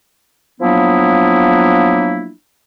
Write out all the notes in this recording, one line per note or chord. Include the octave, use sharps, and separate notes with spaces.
F3 F#3 A#3 B3 D4 E4